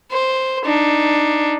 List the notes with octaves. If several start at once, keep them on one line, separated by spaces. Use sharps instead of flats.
C5
D4 D#4